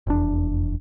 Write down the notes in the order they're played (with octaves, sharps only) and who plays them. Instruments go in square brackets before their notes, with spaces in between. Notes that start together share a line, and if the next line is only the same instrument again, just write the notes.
[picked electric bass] F1 E2 D4